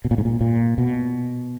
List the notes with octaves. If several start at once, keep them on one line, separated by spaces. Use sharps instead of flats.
B2
A#2
G#2
A#2
A#2
B2